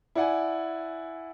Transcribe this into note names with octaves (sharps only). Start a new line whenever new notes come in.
E4 D5 F#5 G#5